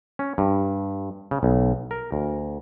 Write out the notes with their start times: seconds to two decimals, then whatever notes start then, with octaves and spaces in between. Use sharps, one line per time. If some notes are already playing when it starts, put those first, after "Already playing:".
0.19 C#4
0.38 G2
1.31 C#3
1.43 B1
1.91 A#4
2.12 D2